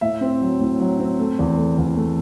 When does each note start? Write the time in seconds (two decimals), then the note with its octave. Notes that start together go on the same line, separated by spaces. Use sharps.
0.01 A2 E5
0.21 C4
0.41 F#3
0.60 A2
0.80 F#3
1.00 C4
1.19 A3
1.39 E2
1.57 A3
1.78 E2
1.96 A3